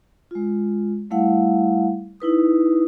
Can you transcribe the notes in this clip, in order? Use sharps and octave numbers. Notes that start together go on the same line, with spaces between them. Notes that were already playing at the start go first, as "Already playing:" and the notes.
G#3 F4
G3 A3 E4 F5 F#5
D#4 E4 B4 D#6